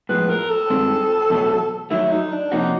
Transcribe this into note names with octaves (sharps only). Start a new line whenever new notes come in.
A2 F3 G#3 B3 B4
A#4
A4
G2 D#3 G#3 C4
E2 B2 F#3 A3
D#3 F#3 A3 E4
D#4
D4
C3 F3 A#3 C#4 D#4 F#4